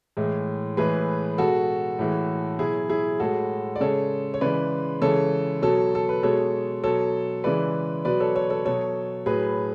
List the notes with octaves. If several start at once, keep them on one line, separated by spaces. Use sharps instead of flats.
A2 E3 G#3
A2 E3 G#3 G#4 B4
B2 G#3 F#4 A4
A2 E3 G#3
B2 F#3 E4 G#4
E4 G#4
A2 G#3 F#4 A4
D5
C#3 G#3 A4 C#5
C#5
C#3 E3 G#3 B4 D5
C#3 E3 G#3 A4 C#5
B2 F#3 A4 C#5
A4
B4
B2 G#3 A4 C#5
B2 F#3 A4 C#5
C#3 E3 G#3 B4 D5
B2 F#3 B4 D5
A4 C#5
A4 C#5
A4 C#5
B2 F#3 A4 C#5
A2 F#3 G#4 B4